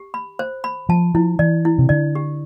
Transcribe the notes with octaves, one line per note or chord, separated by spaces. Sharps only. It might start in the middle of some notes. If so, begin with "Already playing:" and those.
Already playing: G4
B5
C5
B5
F3 A5
F3 E4
E3 D5
E4
C3
D3 D5
G4